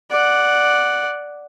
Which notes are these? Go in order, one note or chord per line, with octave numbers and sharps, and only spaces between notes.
D5 F#5